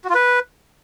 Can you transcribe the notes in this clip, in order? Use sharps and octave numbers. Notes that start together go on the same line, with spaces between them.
F#4
F4
B4